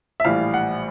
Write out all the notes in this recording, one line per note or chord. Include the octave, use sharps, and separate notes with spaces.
E5
A#1 A2 E3 G3 F5
F#5